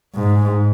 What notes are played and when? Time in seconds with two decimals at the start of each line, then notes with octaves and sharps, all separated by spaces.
0.15 G#2